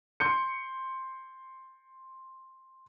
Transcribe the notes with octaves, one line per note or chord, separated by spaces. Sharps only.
C6 G6 C#7